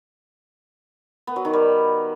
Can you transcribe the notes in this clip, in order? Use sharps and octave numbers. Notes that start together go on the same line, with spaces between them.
B3
F#3
D#3
G3